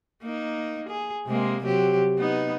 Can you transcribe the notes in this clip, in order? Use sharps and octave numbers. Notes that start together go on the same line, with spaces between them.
A#3 D#4
G#4
C3 G#3 A#3
C3 F#3 G4
B3 D#4